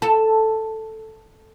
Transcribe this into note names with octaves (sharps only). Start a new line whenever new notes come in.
A4